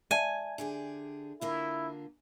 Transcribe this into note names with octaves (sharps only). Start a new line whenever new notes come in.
D5 E5 G#5 A5
D3 G4 G#4
D3 A#3 E4 F4